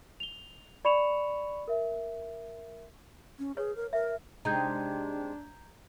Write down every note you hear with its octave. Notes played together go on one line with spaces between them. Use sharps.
F7 G7
D5 B5 C#6 C#7 E7 F7
A#4 E5
C#4
G#4 B4 C#5
A#4
A#4 E5
C3 G#3 D4 D#4 A#5 G6 G#6